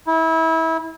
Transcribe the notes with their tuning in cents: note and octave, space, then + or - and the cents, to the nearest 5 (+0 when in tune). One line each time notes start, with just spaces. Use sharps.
E4 -25